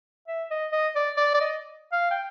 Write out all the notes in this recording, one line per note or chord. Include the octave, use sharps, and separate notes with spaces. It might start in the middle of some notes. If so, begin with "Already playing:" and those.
E5
D#5
D#5
D5
D5
D5
D#5
F5
G5